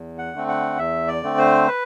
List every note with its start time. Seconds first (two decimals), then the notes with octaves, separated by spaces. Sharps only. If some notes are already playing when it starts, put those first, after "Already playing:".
Already playing: E2
0.18 F#5
0.33 D3 A3 C4
0.48 F#5
0.78 E2 E5
1.08 D5
1.23 D3 A3 C4
1.38 C5
1.68 B4